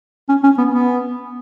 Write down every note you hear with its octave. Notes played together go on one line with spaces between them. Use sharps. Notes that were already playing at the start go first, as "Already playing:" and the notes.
C#4
C#4
B3
B3